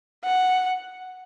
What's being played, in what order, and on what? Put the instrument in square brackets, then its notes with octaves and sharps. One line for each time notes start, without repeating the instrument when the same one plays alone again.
[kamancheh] F#5